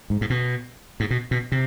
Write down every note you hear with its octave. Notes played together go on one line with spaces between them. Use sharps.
G#2
G#2
B2
G#2
B2
B2
C3